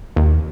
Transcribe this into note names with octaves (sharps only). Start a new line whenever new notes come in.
D#2